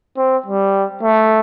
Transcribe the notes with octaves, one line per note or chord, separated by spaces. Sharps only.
C4
G3
A3